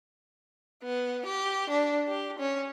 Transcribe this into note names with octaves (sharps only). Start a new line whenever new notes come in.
B3
G4
D4
G4
C#4